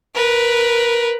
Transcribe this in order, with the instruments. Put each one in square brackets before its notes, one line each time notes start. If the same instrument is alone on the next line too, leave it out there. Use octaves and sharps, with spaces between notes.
[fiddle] A#4 B4